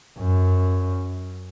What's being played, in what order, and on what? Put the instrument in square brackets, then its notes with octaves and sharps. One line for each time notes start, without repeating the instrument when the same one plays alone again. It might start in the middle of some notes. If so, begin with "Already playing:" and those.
[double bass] F#2